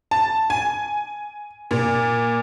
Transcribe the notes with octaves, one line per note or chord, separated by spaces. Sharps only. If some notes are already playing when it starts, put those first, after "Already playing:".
A5
G#5
A#2